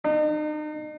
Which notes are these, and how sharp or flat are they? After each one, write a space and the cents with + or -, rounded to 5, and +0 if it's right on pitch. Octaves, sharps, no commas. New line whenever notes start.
D#4 -40